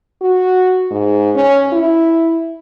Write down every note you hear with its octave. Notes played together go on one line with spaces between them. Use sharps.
F#4
G#2
C#4
E4